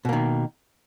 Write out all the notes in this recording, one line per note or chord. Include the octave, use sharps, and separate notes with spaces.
B2 D#3 A#3